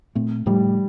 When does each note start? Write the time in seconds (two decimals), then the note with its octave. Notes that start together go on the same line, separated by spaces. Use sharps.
0.15 A#2 A3 C4
0.46 A2 F3 G3 A3